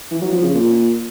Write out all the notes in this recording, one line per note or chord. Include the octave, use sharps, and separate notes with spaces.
E3
F#3
F3
C#3
A#2